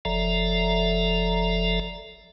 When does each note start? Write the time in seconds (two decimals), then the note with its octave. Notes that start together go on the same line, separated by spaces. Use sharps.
0.05 F#1 F3 A4 D5 E5 A#5